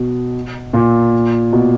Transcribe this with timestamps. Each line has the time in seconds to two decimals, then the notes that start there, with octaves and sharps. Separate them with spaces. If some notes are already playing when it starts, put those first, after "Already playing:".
Already playing: B2
0.73 A#2
1.53 B2